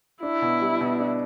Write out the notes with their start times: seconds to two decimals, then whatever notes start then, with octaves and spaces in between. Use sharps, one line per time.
0.23 D4 E4
0.42 B2
0.61 G3
0.81 B2
1.00 D4